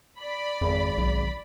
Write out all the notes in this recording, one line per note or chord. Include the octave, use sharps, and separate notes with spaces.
D5 B5
G#1 F2
B1